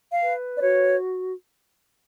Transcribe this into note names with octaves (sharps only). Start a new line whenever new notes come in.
F5
B4
D5
F#4 C#5